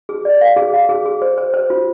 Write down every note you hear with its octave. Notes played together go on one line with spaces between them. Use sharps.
G#4
D5
F5
G#4
F5
G#4
G#4
C5
C5
C5
F4